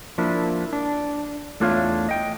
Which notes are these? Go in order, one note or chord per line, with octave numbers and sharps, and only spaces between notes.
F3 A#3 D4 E4
D4
E2 A3 D4 F4 C#5 F5
D#5 G5